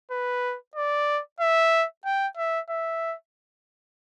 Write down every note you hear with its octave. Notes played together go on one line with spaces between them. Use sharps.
B4
D5
E5
G5
E5
E5